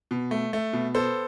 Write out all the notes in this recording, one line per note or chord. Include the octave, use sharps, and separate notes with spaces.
B2
A3
A3
B2
B3 A4 C5